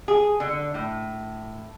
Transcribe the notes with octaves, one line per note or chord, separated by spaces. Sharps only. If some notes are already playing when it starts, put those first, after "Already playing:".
G#4
D3
A2